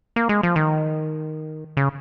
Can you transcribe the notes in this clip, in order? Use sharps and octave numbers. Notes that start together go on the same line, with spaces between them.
A#3
G#3
F3
D#3
C#3